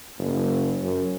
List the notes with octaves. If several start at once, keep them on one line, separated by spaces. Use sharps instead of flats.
F#1
F#2